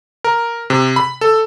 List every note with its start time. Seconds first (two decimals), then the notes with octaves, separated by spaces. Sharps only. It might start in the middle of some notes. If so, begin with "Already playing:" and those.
0.24 A#4
0.70 C3
0.96 B5
1.21 A4